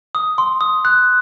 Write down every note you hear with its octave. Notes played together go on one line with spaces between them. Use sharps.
D#6
C6
D#6
F#6